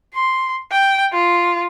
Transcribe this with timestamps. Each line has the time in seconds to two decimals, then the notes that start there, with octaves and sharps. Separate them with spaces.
0.14 C6
0.71 G5
1.13 F4